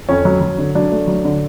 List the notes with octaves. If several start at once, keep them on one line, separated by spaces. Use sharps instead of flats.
F2 C#4
F#3
F#3
D3
F#3 D4
A3
F#3
D3